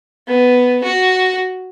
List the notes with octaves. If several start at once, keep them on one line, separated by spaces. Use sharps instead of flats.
B3
F#4